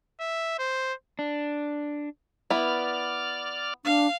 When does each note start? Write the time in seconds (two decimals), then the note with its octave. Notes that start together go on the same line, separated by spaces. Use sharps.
0.20 E5
0.59 C5
1.19 D4
2.50 B3 E4 D5 F6
3.85 D4 F5